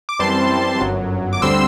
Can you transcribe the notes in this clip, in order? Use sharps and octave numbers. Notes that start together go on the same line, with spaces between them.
D6
F#2 E3 G3 C4 A5 C6
G1 F#2 F#3
D6
D2 D3 G3 C4 C6 E6